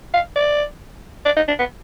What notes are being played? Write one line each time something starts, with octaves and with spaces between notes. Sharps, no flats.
F5
D5
D5
D#4
D4
B3